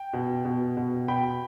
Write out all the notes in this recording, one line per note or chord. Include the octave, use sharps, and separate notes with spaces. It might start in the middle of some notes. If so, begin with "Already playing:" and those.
Already playing: G5
B2
B2
B2
B2 G5 B5